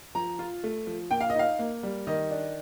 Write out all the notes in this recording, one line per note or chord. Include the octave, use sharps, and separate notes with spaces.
F3 A#5
F4
A3
F3
A#2 G5
F5
D#5
D#4 F5
A#3
G3
D#3 D#5
D4